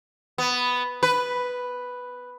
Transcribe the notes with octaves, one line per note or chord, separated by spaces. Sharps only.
B3
B4